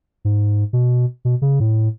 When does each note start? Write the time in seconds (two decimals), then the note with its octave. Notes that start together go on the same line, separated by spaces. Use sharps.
0.25 G#2
0.73 B2
1.25 B2
1.42 C#3
1.60 A2